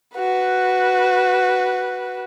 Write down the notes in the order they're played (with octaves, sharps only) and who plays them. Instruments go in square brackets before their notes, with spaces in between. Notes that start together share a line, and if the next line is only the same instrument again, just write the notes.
[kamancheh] F#4 B4